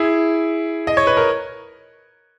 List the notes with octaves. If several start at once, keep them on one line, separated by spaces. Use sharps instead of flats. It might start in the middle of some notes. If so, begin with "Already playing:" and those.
Already playing: E4 G#4
D#5
C#5
B4
A#4